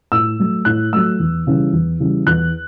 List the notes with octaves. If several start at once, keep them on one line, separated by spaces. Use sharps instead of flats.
A2 E6
F#3 A3
A2 F#6
F#3 A3 E6
E2
C#3 E3 G3
E2
C#3 E3 G3
E2 F#6